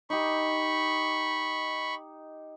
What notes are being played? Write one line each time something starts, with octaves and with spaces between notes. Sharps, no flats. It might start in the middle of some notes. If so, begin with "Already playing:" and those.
D#4 G4 B5 C#6